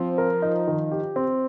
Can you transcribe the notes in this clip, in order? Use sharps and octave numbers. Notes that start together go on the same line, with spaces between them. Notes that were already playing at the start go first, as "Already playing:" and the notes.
Already playing: F3 C4
A#4
D#4
D#3
G4
C4